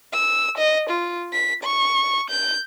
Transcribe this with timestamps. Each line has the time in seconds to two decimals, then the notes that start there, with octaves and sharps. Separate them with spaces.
0.13 E6
0.58 D#5
0.90 F4
1.33 B6
1.63 C#6
2.30 G6